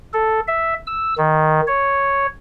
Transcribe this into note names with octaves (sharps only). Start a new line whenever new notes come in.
A4
E5
E6
D#3
C#5